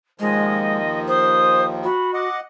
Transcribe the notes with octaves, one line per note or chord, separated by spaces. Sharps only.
D#2 D#3 F3 G#3 D#5
C5 D#6
F#4 B5
D#5 F#5 D6